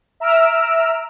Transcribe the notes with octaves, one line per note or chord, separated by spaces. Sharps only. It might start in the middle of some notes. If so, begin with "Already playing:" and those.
E5 A#5 E6 F6 D7